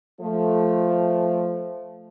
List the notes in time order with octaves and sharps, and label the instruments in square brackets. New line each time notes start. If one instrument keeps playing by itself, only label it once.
[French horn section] F3 A3